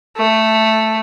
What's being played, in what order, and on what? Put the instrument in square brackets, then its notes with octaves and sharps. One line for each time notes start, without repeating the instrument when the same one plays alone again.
[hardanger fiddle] A3